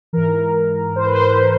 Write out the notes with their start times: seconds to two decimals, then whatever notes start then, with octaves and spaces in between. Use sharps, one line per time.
0.13 G#2 E3 A#4
0.96 C5
1.06 B4
1.15 C5